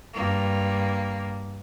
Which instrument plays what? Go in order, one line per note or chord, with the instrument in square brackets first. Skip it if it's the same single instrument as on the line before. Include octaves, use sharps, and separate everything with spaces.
[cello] G2 A#3